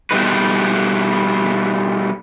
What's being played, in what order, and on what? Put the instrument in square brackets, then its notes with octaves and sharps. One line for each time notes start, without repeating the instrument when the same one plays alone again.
[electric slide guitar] B2 G3 A3 D#4 B4